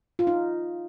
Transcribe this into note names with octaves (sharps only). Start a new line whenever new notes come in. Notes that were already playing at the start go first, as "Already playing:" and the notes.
F4
D#4